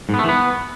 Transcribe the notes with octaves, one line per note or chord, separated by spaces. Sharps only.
G#2
B3
A3
E3
B3